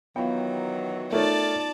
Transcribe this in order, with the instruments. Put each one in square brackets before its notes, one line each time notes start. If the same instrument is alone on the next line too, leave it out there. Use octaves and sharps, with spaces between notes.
[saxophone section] D#3 E3 F#3 [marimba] B3 F4 F5 [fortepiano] G5
[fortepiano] A3 A#4 C#5 [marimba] D#4 F4 [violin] D5 A5